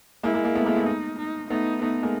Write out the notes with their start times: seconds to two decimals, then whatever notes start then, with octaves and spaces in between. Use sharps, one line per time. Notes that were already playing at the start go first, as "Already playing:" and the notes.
0.23 G#3 A#3 E4
0.34 G#3 A#3
0.44 G#3 A#3
0.55 A3 B3
0.66 G#3 A#3
0.76 A3 B3
0.86 D#4
1.18 D#4
1.50 A3 B3 D#4
1.82 A3 B3 D#4
2.03 G#3 A#3